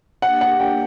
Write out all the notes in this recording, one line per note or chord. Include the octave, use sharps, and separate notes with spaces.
A#3 D4 G4 F#5
F#5
G5